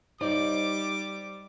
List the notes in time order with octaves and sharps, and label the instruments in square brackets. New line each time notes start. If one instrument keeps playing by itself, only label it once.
[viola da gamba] G3 [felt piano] D#4 [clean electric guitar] C5 D5 D#5 [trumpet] D6